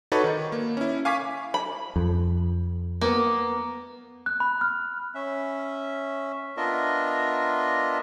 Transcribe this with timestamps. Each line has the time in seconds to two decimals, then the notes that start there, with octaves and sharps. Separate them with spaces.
0.12 D#4 F#4 A4 B4 C#5 D5
0.24 D#3
0.52 A#3
0.77 C#4 E4
1.05 F5 G#5 C#6 D6 F6 B6
1.54 B5
1.96 F2
3.01 A#3 B3
4.26 F#6
4.40 B5
4.61 F6
5.15 C#4 E5
6.57 B3 D4 F4 A#4 D#5 E5